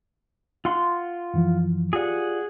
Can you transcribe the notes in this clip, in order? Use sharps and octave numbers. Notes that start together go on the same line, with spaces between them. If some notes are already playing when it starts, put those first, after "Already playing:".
F4 F#5 C6
F#2 E3 F3
F4 G4 G#4 D5 F#5